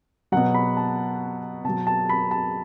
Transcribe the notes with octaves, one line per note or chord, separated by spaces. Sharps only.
B2 F#3 F#5
B5
A5
B2 F#3 A5
A5
B5
A5